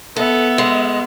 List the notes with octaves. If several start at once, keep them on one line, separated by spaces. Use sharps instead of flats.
B3 A4 E5
G#3